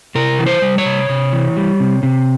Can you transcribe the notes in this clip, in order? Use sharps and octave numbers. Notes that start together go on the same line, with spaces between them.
C3 A#4
E3
C5
G3
C#5
C3
C3
E3
G3
C3
C3